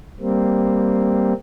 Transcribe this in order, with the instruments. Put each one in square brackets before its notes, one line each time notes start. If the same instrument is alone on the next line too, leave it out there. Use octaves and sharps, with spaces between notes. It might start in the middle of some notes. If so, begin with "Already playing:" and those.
[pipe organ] G3 A#3 C4